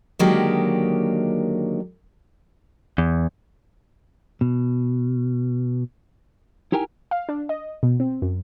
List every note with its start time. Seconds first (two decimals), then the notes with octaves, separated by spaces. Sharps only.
0.19 D3 D#3 F#3 G#3 A#3 G4
2.98 E2
4.41 B2
6.72 D#4 E4 G4 A#4 G5 G#5
7.11 F5
7.29 D4
7.49 D#5
7.83 B2
8.00 C4
8.22 F#2